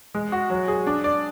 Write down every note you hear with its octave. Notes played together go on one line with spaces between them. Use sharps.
G#3
F#4
F#3
G#4
D4
D5